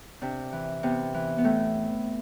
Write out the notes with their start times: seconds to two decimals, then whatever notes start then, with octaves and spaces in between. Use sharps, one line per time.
0.21 C3 D4
0.52 E3
0.83 C3 B3
1.14 E3
1.38 B3
1.44 A2 A3